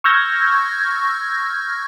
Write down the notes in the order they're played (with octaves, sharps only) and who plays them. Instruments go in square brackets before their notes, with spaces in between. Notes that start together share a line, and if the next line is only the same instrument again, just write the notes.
[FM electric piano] C#6 E6 F6 G6 G#6 A#6